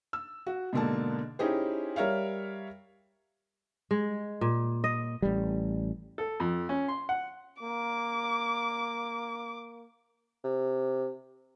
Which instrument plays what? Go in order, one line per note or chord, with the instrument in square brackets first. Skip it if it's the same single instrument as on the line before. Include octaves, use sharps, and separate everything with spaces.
[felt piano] E6
F#4
G#2 B2 D3 A#3 A4 A5
C#4 D#4 E4 G4 G#4 C5
G3 A#4 C#5 E5 F5
[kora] G#3
A#2
D#5
[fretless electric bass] A1 G3
[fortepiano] A4
F2
C#4
C6
F#5
[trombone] A#3 [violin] D6
[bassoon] C3